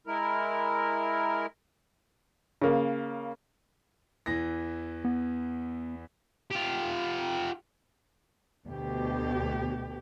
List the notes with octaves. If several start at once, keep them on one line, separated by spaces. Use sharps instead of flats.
G#3 E4 A#4
C#3 A#3
E2 E3 A#6
B3
F4 G4
D2 B2 G4